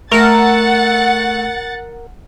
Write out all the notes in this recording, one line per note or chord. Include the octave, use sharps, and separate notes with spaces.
A3 A4 A#4 F#5 A6